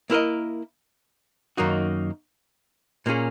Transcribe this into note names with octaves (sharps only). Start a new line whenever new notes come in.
A#3 E4 A#4 D#5
F#2 D#3 A#3 D#4 F#4
A#2 A#3 C#4 G#4